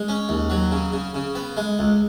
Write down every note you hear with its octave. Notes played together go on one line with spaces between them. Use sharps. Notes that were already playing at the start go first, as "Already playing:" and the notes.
Already playing: G#3
C#4
D#2
F#3
C#3
C#3
C#3
B3
G#3
C#2